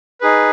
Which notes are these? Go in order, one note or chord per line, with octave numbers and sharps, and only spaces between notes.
D#4 G#4 B4